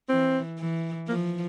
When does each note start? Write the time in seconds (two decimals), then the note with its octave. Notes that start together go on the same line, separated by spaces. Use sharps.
0.09 E3 C4
0.59 E3
1.08 F3 A#3